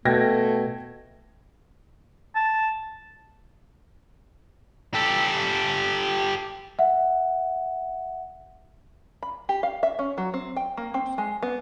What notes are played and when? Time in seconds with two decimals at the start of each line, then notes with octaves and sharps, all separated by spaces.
0.05 B2 A3 G5 G#6 A#6
2.35 A5
4.95 G4 A4
6.79 E5 F#5
9.23 B5
9.49 G4
9.63 F5
9.83 E5
9.99 C#4
10.18 F#3
10.34 C4
10.57 G5
10.77 A#3
10.94 C4
11.18 G#3
11.43 B3